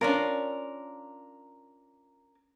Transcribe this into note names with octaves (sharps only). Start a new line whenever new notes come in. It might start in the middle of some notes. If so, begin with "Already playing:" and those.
C#4 D4 F4 A#4